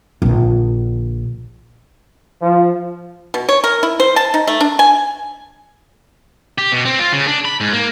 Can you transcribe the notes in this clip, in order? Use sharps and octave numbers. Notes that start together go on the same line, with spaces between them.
A#1 D3
F3
B2
C#5
A#4
E4
C5
A5
D#4
A3
D4
G#5
G4
B2
C4
F4
C#3
D4
B5
G#2
A#3